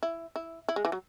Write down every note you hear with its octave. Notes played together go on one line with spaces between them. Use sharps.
E4
E4
E4
G#3
E3
F#3